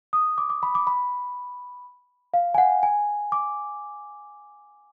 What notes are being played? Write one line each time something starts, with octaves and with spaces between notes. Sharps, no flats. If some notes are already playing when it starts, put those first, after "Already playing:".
D#6
D6
D6
B5
D6
B5
F5
G#5
F#5
G#5
D6